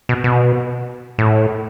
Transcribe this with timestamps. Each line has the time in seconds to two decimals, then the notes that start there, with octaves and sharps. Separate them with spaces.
0.09 B2
0.24 B2
1.18 A2